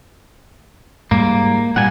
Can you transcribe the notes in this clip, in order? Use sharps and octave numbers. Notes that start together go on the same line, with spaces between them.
G#2 G3 A#3
A#2 G3 F#5 G#5